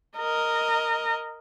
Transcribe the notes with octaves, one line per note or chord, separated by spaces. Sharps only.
A#4 D#5